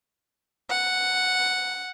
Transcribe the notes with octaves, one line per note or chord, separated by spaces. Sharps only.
F#5